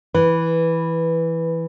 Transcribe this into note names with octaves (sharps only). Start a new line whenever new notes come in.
E3 B4